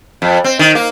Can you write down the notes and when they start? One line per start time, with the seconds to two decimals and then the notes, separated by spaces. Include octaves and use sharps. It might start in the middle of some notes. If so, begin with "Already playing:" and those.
0.22 F2
0.44 C4
0.59 D#3
0.75 A#3